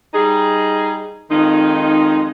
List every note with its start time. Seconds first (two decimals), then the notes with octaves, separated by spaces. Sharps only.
0.14 G3 D#4 G#4
1.31 F2 D#3 G#3 D#4